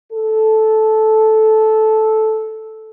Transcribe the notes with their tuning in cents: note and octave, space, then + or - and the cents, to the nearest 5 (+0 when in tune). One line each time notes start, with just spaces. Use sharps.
A4 -10